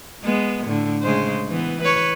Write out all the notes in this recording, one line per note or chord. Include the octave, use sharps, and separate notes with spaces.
G#3 B3
A2 D3
C#3 G#3 C5
E3 B3
B4 C#5